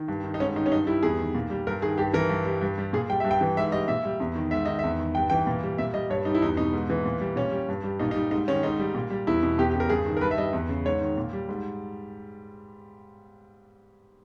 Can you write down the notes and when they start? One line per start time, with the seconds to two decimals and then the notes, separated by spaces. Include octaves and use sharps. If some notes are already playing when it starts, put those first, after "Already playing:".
Already playing: D#3
0.08 G2
0.24 D#3
0.34 D#4
0.40 G#2 C#4
0.56 D#3 D#4
0.66 C#4
0.71 G2 D#4
0.87 G3 E4
1.03 E2 G#4
1.18 D#3
1.35 A#2
1.50 G3
1.67 G2 A#4
1.82 D#3 G#4
1.98 G2 G4
2.14 E3 A#4
2.29 G2
2.45 G3
2.61 G2
2.78 G3
2.93 A#2 G#4
3.09 G3 G5
3.20 G2 E5
3.31 G5
3.41 E3
3.57 G#2 E5
3.72 G3 D#5
3.88 A#2 E5
4.05 G3
4.20 E2
4.36 D#3
4.51 G#2 E5
4.66 D#3 D#5
4.79 E2 E5
5.00 D#3
5.15 G2 G5
5.30 E3 G5
5.47 A#2
5.63 G3
5.78 A#2 E5
5.94 G3 D#5
6.10 G2 C#5
6.25 G3 D#4
6.35 E4
6.42 E2 D#4
6.57 B2 D#4
6.73 G#2
6.90 E3
7.05 A#2
7.21 G3
7.36 A#2 C#4
7.52 G3
7.68 G2
7.84 G3
7.99 A#2 D#4
8.11 D#4
8.15 G3
8.31 G#2 D#4
8.48 D#3 C#4
8.63 G#2 D#4
8.79 G3
8.95 A#2
9.10 G3
9.27 E2 E4
9.43 B2
9.58 E2 G4
9.70 G4
9.75 C#3
9.80 A#4
9.89 G2 G#4
10.06 D#3
10.17 A#4
10.21 G2 B4
10.31 E5
10.38 G3 D#5
10.53 E2
10.69 C#3
10.85 G#2 C#5
11.01 D#3
11.17 A#2
11.33 G3
11.49 G#2